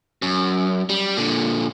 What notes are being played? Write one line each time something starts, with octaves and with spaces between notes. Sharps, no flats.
F#2
G3
A#2 D3